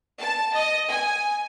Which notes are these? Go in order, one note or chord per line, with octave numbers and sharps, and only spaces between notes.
A5
D#5
G#5